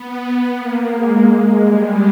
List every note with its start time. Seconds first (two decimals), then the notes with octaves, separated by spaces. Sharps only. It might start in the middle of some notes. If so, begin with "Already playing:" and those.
Already playing: B3
0.57 A#3
0.93 G#3
1.64 G3